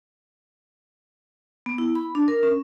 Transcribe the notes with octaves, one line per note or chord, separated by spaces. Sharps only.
B3
E4
B5
D4
A#4
C#4